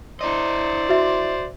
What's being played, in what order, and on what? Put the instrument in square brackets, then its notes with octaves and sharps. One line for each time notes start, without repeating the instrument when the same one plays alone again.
[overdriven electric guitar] E4 D#5 [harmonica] C5 D5
[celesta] F#4 E5